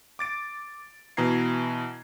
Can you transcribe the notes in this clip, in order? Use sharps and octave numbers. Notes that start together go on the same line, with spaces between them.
D6 A6 D7
B2 E3 A#5 G#6 C7